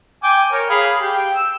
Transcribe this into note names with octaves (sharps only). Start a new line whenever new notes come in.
G5 G#5 D6
A#4 C#5
G#4 F5 B5
G4
G5
E6